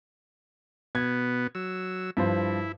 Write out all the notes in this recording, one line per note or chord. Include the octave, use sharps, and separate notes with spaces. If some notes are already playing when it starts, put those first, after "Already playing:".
B2 B3 G#6
F#3 E6
G2 F3 E4 C5